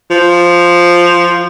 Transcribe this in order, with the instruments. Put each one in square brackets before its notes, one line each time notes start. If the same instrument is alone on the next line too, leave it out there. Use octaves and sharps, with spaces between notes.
[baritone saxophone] F3